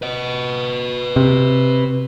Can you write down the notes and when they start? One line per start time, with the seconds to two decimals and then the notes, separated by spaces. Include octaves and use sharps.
0.02 B4 D#5
1.16 C3